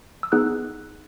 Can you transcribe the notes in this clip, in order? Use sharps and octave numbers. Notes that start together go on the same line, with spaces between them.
E6
B3 D#4 G#4 F#6